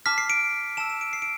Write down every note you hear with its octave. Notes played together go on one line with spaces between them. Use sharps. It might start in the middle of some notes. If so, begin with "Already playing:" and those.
A5 D6 F6 B6
C7
D7
A5 E6 E7
E7
D7
C7
D7